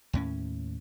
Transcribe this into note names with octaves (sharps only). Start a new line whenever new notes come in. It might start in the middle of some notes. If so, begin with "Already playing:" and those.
D#2 A2 C#4